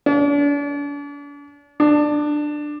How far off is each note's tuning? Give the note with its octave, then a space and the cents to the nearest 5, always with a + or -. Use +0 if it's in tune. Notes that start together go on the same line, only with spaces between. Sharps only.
D4 -40
D4 +15